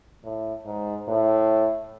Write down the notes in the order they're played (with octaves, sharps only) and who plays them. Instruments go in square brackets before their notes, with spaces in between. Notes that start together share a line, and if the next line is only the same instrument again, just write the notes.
[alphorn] A2
G#2
A2